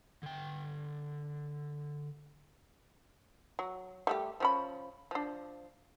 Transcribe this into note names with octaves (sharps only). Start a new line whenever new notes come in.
D3 G5
F#3
G3 A3 G4
F3 C#4 B5
F3 D4